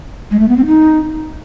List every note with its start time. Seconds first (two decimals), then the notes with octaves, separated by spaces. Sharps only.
0.31 G#3
0.39 A3
0.48 B3
0.57 C4
0.66 D#4